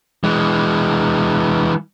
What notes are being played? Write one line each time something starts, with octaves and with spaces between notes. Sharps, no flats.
E3 G#3